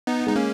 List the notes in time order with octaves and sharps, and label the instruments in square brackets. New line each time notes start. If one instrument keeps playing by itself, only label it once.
[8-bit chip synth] B3 D#4
[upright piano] G#3 [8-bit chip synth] D#4
[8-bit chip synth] A#3 C#4